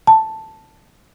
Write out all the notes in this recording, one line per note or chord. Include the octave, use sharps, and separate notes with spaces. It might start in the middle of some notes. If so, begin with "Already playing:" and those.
A5